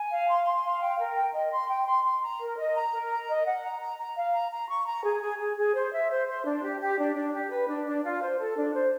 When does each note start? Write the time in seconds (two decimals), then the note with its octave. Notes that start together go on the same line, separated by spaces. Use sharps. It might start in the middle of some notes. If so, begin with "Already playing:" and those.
Already playing: G#5
0.11 F5
0.28 C6
0.45 C6
0.64 F5
0.81 G5
0.99 A#4
1.16 G5
1.34 D#5
1.52 C6
1.69 G5
1.87 C6
2.05 C6
2.22 A#5
2.40 A#4
2.57 D#5
2.75 A#5
2.93 A#4
3.10 A#5
3.28 D#5
3.46 F#5
3.63 A#5
3.81 A#5
3.98 A#5
4.16 F5
4.33 A#5
4.51 A#5
4.68 C#6
4.86 A#5
5.04 G#4
5.22 G#4
5.39 G#4
5.56 G#4
5.74 C5
5.92 E5
6.10 C5
6.27 C5
6.45 D4
6.63 G4
6.80 G4
6.97 D4
7.16 D4
7.33 G4
7.51 B4
7.68 D4
7.86 D4
8.04 F4
8.21 C5
8.39 A4
8.57 D4
8.74 C5